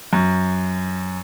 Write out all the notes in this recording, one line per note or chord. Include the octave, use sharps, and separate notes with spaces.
F#2